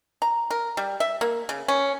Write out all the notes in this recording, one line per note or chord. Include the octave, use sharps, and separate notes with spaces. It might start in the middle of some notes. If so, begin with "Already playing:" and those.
A#5
A#4
G3
E5
A#3
C#3
C#4